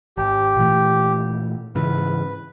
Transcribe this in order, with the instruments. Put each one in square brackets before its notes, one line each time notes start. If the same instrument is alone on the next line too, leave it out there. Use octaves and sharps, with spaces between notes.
[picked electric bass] G#1 [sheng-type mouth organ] G4
[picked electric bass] A#2 E3 A3
[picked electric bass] G#2 C#3 E3 [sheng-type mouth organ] B4